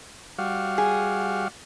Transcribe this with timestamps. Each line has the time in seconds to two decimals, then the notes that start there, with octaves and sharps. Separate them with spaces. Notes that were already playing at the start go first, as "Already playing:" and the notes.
0.38 G3 F#4 F5
0.78 G#4